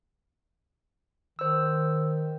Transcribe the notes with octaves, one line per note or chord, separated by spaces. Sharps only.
D#3 C5 E6